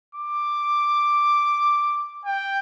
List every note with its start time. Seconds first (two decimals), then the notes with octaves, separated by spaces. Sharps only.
0.15 D6
2.25 G5